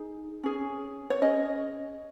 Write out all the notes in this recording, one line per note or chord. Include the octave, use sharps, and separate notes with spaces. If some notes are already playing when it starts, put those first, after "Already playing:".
Already playing: D#4 G#4
C#4 G#4
C#5
C#4 G#4 D#5